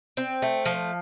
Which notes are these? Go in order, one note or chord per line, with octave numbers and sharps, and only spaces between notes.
C4
A3
F3